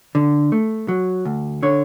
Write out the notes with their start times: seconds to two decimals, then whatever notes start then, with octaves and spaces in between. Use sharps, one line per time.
0.15 D3
0.52 A3
0.88 F#3
1.25 D2
1.63 D3 C#5